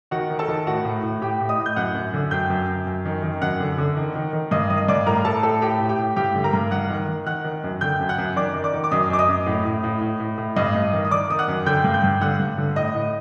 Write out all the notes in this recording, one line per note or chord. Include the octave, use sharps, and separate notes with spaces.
D#3 F#4 F#5
D#3
A4 A5
D#3
A2 F#4 F#5
A2
A2
A2 G4 G5
A2
D#5 D#6
A2
G6
F#2 F#5 F#6
F#2
D3
F#2 G5 G6
F#2
F#2
F#2
D#3
D#3
F#2 F#5 F#6
D3
D3
D#3
D#3
D#3
G2 D#5 D#6
D#3 D#5 D#6
G2 D5 D6
A2 A#4 A#5
A2 A4 A5
A2 A4 A5
A2 G4 G5
A2
G4 G5
A2
G2 G4 G5
D3
A#4 A#5
G2
D#3 F#5 F#6
D#3
D#3
D#3 F#5 F#6
D#3
F#2
D3 G5 G6
F#2
F#5 F#6
F#2
D#3 D5 D6
D#3
D5 D6
D#3
D6
F#2 D#5 D#6
F#2 D6
D#5 D#6
F#2
A2
A2
A2
A2
A2
A2
G2 D#5 D#6
G2
D#3
D#6
D#3 D5 D6
D#3 D#6
F#5 F#6
F#2
D3 G5 G6
G2
G5 G6
G2
D3 F#5 F#6
G2
D3
A2 D#5 D#6
A2